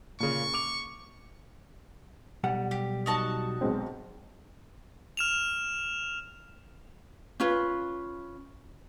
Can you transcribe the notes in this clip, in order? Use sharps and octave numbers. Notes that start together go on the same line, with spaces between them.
A#2 C#3 C#6
D6 F7
B1 G3 F#5
G4
D#4 F#4 A5
B1 G#3 C4
F6 E7 F7
C#4 F4 B4